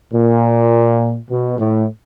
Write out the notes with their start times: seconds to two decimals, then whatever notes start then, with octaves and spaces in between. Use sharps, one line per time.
0.12 A#2
1.29 B2
1.58 A2